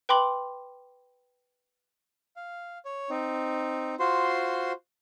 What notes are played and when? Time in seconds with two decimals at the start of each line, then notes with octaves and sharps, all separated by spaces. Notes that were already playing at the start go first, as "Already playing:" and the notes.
0.09 B4 G5 B5 C6 D6 F#7
2.36 F5
2.85 C#5
3.10 C4 D#4
3.99 F4 F#4 C5 C6